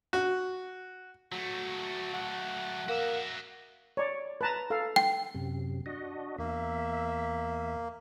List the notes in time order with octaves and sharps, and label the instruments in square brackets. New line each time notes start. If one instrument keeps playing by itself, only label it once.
[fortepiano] F#4
[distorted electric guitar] F#3 A3 [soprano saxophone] F#4
[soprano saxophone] F#5
[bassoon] A#3 [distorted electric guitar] F#4 E5
[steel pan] C#5 D5
B4 A5 A#5
A4 F5
[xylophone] G5
[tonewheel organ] F#2 C3
D4 F#4 D#5
[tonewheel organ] E2 E5 [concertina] A#3